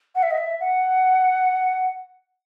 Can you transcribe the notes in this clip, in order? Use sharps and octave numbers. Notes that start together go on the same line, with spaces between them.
F#5
E5
D#5
E5
F#5